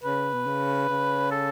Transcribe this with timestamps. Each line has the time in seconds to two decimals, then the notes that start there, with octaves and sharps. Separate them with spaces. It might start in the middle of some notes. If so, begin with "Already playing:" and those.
0.04 C#3 B4
0.34 B2
0.46 C#3
0.89 C#3
1.31 A4